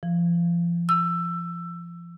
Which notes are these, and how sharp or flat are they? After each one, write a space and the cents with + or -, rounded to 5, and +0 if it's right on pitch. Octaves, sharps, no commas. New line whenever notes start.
F3 -35
E6 +15